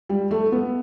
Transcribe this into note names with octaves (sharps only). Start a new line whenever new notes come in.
G3
A3
B3